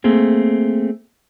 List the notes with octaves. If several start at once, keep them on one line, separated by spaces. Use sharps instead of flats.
A3 A#3 C4 G#4